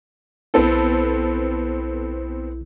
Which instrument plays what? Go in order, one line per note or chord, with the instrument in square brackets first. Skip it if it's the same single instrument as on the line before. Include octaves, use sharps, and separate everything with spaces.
[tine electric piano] B1 E4 [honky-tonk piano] B3 C4 A4